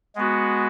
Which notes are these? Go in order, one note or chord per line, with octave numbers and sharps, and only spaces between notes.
G#3 B3 F#4